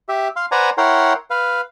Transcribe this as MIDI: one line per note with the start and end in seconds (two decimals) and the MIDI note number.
0.09 0.28 67
0.09 0.28 76
0.36 0.46 77
0.36 0.46 84
0.52 0.70 71
0.52 0.70 72
0.52 0.70 74
0.52 0.70 78
0.52 0.70 80
0.52 0.70 82
0.78 1.13 64
0.78 1.13 70
0.78 1.13 73
0.78 1.13 78
0.78 1.13 79
0.78 1.13 84
1.30 1.61 71
1.30 1.61 77